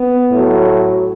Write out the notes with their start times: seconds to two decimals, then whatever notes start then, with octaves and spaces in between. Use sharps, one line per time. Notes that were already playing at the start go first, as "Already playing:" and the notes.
Already playing: B3
0.30 A2 F#3